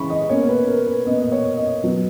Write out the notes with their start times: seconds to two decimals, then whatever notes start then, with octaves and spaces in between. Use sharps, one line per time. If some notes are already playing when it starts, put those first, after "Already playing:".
Already playing: C#3 E3 G#3 B5 C#6
0.10 D#5
0.29 B2 A#3 C#4 C#5
0.49 B4
0.67 A#4
0.87 B4
1.05 B2 A#3 C#4 D#5
1.21 D#5
1.32 C#5
1.57 D#5
1.83 B2 F#3 B3